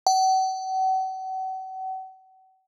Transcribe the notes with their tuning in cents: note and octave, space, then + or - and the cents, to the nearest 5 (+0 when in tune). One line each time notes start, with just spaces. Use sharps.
F#5 +40